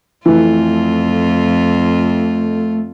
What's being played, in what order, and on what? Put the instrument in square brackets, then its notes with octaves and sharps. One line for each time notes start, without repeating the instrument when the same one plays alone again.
[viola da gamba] F2 F4 [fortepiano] E3 [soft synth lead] A3